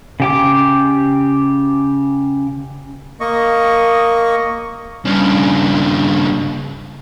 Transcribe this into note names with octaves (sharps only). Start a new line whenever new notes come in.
C#3 G4 D6
A#3 D#5 C#6
G2 C#3